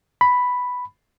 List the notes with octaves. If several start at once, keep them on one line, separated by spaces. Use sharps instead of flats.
B5